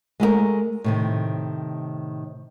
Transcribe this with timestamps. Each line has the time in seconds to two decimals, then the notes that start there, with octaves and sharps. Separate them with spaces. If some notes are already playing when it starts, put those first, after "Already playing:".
0.20 G#3 A3 G4 A#4
0.84 A2 C3 D#3